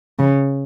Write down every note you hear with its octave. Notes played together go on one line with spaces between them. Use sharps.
C#3